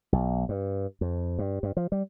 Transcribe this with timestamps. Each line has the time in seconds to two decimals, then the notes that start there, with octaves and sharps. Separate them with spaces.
0.12 B1
0.49 G2
1.01 F2
1.39 G2
1.63 G2
1.77 F3
1.92 G3